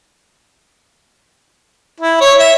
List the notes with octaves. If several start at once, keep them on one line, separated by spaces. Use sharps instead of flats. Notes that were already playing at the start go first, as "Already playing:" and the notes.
E4
C#5
E5